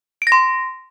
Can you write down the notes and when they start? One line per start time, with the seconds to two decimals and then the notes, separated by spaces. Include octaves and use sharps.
0.22 D7
0.27 A#6
0.32 C6